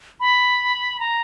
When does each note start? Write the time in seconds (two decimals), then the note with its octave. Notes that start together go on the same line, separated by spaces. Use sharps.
0.20 B5
1.00 A#5